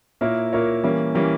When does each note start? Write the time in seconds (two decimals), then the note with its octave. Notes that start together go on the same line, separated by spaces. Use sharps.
0.21 A#2 A#3 E4 A#4 C#5
0.53 A#2 A#3 E4 A#4 C#5
0.84 E3 G3 A#3 C#4
1.15 E3 G3 A#3 C#4